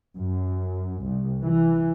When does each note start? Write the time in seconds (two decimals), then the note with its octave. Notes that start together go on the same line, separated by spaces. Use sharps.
0.17 F#2
1.05 C2
1.43 E3